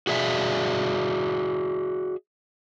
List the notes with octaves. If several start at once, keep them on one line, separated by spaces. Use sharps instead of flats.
F#4 G#4 D5 E5